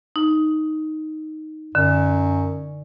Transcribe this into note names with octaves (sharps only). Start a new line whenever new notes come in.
D#4
F#2 D3